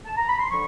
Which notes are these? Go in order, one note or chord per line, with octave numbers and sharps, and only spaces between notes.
A5
A#5
B5
C6
D3 F3 C#6